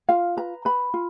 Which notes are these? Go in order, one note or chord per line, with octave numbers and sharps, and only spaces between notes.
F4 F5
B4 A#5
B4 B5
F4